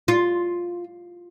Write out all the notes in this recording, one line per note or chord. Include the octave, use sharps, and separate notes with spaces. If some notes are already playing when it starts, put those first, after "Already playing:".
F4